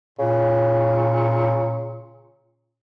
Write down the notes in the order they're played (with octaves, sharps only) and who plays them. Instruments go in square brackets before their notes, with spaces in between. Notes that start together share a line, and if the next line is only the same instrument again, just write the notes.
[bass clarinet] A#2 [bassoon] C#3